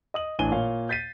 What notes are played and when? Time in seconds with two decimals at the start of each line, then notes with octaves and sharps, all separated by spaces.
0.14 D#5 D#6 F#7
0.39 A1 E3 D4 G#5 D#7 G7
0.52 A#2 C#5 F5
0.89 G6 A6 B6 C7 D#7